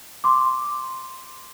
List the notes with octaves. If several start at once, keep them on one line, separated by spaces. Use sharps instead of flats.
C6 D6